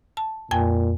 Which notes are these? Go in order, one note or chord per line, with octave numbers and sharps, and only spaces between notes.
A5
F2 A#2 G5 G#5